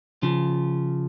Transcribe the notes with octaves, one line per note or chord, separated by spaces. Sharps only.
C#3 F3